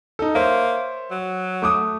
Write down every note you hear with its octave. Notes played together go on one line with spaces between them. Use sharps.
D#4 A4
A#3 C5 C#5 E5
F#3
A3 D6 D#6